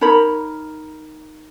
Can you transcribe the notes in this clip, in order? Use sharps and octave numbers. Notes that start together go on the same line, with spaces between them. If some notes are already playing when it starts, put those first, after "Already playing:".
D#4 A#4 C#5 B5